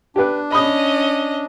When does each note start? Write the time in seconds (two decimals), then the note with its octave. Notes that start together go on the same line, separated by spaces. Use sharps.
0.16 D4 G4 B4
0.52 C#4 D#5 B5 D#6